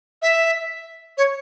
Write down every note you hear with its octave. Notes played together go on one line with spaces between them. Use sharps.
E5
C#5